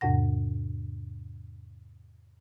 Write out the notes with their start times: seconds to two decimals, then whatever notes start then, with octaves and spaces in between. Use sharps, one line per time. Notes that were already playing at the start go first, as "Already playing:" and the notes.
0.01 E2 G#2 C3 F#5 A#6